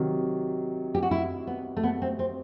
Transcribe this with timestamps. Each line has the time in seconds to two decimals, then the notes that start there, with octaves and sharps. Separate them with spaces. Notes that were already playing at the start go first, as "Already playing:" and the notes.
Already playing: C3 D#3 F#3
0.95 G4
1.03 F#4
1.11 E4
1.47 B3
1.77 A3
1.83 B3
2.02 C4
2.19 C4